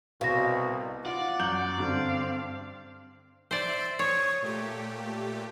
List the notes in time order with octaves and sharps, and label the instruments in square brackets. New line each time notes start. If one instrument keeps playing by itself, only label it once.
[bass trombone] C2 [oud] B2 [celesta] F5 A#6
[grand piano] F4 [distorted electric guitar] D5 [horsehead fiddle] F#5
[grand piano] F#2 G6 F#7
[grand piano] G2 D3 [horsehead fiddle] C4 F5
[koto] C5 D5 [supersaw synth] E5 D7
[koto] C#5 [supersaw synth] C#6 D#6
[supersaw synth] A#2 A3 G4